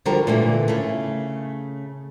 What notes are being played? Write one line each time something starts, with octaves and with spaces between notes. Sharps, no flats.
D3 F3 G3 F#4 A#4
A#2 D3 E3 A3 A#3
C#3 A3